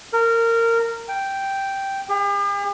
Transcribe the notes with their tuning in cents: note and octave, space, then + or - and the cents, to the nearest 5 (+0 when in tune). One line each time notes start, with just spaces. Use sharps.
A#4 -20
G5 -5
G4 +45